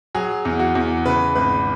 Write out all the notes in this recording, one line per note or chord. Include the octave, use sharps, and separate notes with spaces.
F#3 G#4
E2
F#4
E2
C#3 B4
G#1 B4